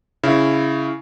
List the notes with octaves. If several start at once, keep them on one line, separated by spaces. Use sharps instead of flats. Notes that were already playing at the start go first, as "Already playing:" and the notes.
C#3 E4